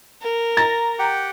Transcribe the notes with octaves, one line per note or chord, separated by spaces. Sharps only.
A#4
A#5 A6
G4 F#5 G5